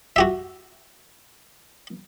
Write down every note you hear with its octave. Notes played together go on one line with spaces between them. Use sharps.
F#4 G4 E5